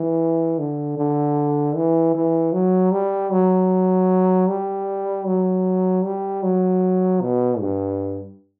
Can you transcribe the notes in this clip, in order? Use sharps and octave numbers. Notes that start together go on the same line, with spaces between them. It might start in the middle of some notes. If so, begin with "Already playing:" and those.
Already playing: E3
D3
D3
E3
E3
F#3
G3
F#3
G3
F#3
G3
F#3
B2
G2